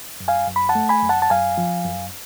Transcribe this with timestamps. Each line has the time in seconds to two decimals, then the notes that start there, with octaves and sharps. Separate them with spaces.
0.20 F#2
0.28 F5 G#5
0.48 F#2
0.56 B5
0.69 F#5 A5
0.75 A3
0.89 G#5 B5
1.03 F#2
1.09 F#5 A5
1.22 A5
1.30 F#2 F5 G#5
1.58 F3
1.85 F#2